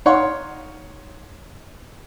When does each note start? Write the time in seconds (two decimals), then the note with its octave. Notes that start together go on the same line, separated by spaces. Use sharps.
0.06 D#4 C#5 F5 F#5 C6 C#6